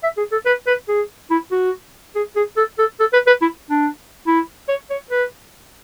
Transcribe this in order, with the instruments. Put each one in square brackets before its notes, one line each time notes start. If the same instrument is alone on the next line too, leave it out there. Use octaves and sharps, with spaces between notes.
[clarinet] E5
G#4
A4
B4
B4
G#4
E4
F#4
G#4
G#4
A4
A4
A4
B4
B4
E4
D4
E4
C#5
C#5
B4